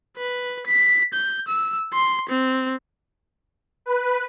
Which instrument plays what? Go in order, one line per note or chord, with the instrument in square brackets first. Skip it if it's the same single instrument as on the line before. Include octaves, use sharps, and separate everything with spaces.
[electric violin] B4
B6
G6
E6
C6
C4
[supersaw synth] B4